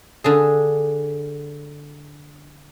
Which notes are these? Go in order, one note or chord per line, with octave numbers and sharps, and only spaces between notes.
D3 D4 G#4